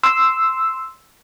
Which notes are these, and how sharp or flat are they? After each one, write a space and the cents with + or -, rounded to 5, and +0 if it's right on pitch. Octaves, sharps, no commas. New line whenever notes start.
C6 -5 E6 +0